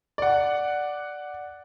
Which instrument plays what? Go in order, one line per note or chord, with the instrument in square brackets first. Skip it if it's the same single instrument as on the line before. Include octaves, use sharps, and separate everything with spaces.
[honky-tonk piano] D5 F#5